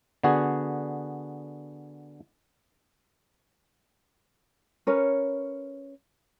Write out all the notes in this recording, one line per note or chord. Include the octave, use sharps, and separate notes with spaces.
D3 B3 F#4 G#4
C#4 A#4 B4 C#5